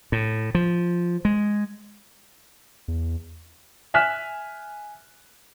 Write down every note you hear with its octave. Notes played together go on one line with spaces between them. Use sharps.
A2
F3
G#3
E2
E5 G#5 F6 F#6 B6 E7